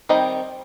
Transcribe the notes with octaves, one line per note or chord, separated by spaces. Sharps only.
D#3 G3 C4 D#5